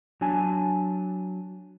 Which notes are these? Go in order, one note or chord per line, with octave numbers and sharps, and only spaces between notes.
F#3 D4 G#5 A5